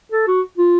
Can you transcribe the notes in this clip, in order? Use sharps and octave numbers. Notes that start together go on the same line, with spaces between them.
A4
F#4
F4